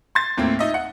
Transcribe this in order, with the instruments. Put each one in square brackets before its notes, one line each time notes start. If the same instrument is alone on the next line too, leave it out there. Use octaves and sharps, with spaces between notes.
[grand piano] C6 G#6 A6
D#2 A2 A#3 C4
D#4 D#5 E5
F#5